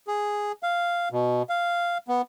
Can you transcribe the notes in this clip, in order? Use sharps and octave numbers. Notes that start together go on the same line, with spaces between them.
G#4
F5
B2
F5
B3